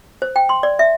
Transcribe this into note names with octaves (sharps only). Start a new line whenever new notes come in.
C5
G5
C6
D5
E5